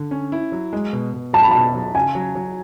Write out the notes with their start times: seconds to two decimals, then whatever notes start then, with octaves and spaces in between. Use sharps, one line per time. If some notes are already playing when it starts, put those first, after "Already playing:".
Already playing: D3
0.11 C#4
0.32 E4
0.52 F#3
0.73 G#3
0.93 B2
1.13 B2
1.33 F#3 A5
1.43 B5
1.51 B2 A5
1.74 F#3
1.95 C#3 G#5
2.15 F#3
2.35 F#3